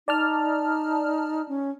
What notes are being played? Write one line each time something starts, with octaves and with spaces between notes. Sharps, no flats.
D#4 D5 A5 F6
C#4